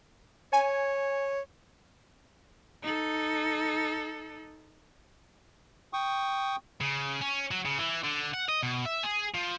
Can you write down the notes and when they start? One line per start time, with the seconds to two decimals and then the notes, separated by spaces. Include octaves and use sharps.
0.53 C#5 G#5
2.82 D#4 A4
5.93 G5 C#6 D#6
6.81 C#3
7.21 C#4
7.51 F#3
7.65 C#3
7.78 E3
8.04 D3
8.34 F#5
8.49 D#5
8.63 B2
8.85 E5
9.03 G#4
9.35 F3